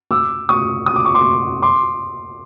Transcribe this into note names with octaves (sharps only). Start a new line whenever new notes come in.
D6 E6
C#6 D#6
D#6
D6
C#6
C6 D6
C6 D6